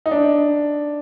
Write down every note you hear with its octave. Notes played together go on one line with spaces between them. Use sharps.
D#4
D4